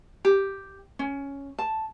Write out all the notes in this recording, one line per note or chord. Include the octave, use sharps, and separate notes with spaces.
G4
C#4
A5